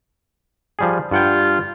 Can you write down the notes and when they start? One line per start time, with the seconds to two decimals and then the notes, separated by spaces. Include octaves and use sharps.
0.79 F3 G3 G#4
1.11 G2 F4 F#5 G5